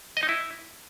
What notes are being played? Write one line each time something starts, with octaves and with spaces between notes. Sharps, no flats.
D#5
D#4
E4